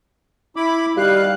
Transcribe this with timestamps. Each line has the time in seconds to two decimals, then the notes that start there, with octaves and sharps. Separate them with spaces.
0.56 E4 B5 D6
0.97 D#3 G3 G4 F5 F#6